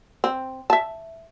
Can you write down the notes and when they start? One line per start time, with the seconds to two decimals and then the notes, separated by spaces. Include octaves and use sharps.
0.24 C4
0.70 E5 A5